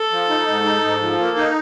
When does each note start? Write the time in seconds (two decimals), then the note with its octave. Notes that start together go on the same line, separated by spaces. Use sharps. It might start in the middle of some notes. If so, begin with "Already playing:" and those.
Already playing: A4
0.11 F3
0.29 D#4
0.47 G#2
0.64 D#4
0.83 G#2
1.01 F3
1.19 A#3
1.37 D#4